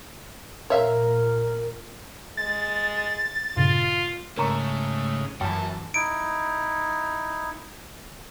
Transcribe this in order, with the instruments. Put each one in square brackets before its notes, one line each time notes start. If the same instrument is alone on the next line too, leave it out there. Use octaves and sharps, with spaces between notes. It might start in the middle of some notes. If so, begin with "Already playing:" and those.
[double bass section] A#2 [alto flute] A#4 [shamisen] C#5 E5 F5
[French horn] G#3 [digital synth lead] A6
[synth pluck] G2 A#2 C#3 [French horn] F4
[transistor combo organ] G#2 C#3 [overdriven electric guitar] A3 [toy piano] A#4 A#5 C#6
[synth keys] F#2 E3 [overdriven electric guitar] A2 A5 [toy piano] G5
[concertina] D#4 E4 [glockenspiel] D7